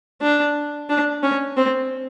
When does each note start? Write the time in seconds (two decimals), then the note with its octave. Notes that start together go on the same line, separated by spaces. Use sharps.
0.21 D4
0.89 D4
1.23 C#4
1.57 C4